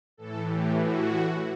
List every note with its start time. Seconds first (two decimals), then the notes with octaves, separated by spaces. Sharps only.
0.17 A2 E3 A4
0.48 G4
0.78 F#4